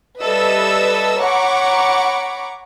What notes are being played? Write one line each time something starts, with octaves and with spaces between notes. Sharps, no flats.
G3 A4 B4 D#5 E5 E6
C#5 F#5 A#5 B5 C#6 D6